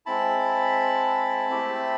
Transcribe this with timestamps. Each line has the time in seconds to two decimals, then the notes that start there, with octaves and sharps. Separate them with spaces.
0.06 G#3 C4 E4 A5 B5
1.49 A3 C4 E4 G4